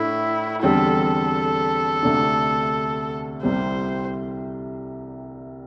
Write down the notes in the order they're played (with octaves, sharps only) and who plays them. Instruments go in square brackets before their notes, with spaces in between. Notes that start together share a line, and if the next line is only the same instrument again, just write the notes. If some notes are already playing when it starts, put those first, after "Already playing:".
Already playing: [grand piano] A2 A3 D4 [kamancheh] E4
[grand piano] E2 D3 G3 C4 [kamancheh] A4
[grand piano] D2 C3 A3 D4
[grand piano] C2 C3 G3 [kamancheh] C5